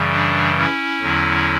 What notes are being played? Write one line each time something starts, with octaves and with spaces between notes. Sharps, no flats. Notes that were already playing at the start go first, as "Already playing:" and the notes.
Already playing: F#2 C#3 E3 G3
D4
C#4 E4
E2 D3 F#3